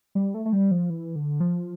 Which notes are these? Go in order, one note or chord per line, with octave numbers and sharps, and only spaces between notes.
G3
A3
A3
G3
F3
E3
D3
F3